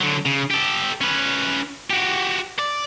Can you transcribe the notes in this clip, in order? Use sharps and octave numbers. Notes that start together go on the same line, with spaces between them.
D3 F#3
C#3
G4 A4
C#4 B4
F#4 G4
D5